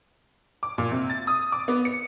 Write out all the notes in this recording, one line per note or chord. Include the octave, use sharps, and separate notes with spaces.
D6
A#2
C3
A6
D#6
D6
B3
C#7